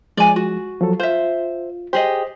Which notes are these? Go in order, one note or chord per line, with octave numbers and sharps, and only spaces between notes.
F3 G#3 D5 G#5
F#4
F3 F#3 A4
F4 C5 E5
G4 G#4 C5 D#5